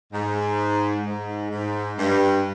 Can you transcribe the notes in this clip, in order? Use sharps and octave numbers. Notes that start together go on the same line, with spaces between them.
G#2
G#2
G#2
G2